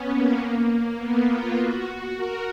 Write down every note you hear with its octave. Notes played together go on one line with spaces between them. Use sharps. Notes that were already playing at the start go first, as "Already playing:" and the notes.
Already playing: B3 C#4
A#3
A#3
B3
F4
F#4
A#4